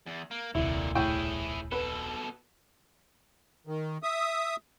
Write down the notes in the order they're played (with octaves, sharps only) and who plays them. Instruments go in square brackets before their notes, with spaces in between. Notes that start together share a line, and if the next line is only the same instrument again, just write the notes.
[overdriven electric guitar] E2
A#3
[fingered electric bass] D#1 C2 [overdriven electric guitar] A#2 D3 [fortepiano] E4
[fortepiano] A2 G5 C#6 [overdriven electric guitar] E4 G#4
[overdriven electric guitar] B2 A4 [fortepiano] B4
[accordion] D#3
E5 D#6